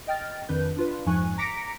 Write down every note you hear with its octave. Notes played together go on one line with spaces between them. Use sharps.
D#5 G5 F6 A6
F2 D#3 D4 B4 G6
D4 F4 B4
F2 G#2 F3 G#5 C#6 F#6
A#5 D6 A#6 B6 C#7 D7